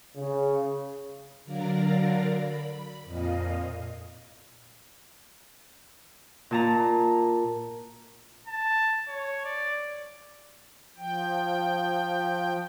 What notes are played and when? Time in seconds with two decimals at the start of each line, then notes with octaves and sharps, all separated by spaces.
0.16 C#3
1.45 D3 F#3 A#4 D5 F5 A#5
2.35 B5
3.04 F2 A#2 D#5 F5
6.51 A#2 A5 A#5
8.48 A5
9.08 C#5
9.44 D5
10.97 F3 G5